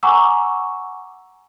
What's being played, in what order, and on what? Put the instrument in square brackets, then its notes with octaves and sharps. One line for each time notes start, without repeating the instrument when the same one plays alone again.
[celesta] F#5 G#5 A#5 C#6 D6 E6